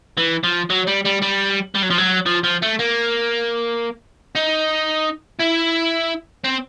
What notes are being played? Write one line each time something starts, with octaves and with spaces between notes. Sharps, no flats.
E3
F3
F#3
G3
G3
G3
G3
F#3
F3
F#3
F3
F3
A3
A#3
D#4
E4
C4